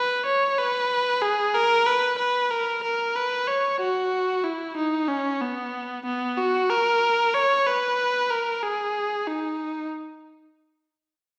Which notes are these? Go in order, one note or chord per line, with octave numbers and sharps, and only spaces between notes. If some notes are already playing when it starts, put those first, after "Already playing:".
Already playing: B4
C#5
B4
G#4
A#4
B4
B4
A#4
A#4
B4
C#5
F#4
E4
D#4
C#4
B3
B3
F#4
A#4
C#5
B4
A#4
G#4
D#4